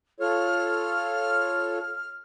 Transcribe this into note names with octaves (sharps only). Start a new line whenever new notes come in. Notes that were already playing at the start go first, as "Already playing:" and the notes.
F4 A4 C#5 F6